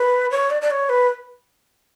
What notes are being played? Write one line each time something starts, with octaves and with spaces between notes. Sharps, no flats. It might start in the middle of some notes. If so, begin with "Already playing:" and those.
Already playing: B4
C#5
D5
D5
C#5
B4